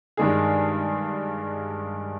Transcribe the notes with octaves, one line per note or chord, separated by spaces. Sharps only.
G2 D#3 G#3 D4 G#4